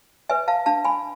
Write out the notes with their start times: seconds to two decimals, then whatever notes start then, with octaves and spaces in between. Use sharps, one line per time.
0.29 B4 E5 G#5
0.48 F5 A5
0.66 D4 F5 A5
0.85 G#5 B5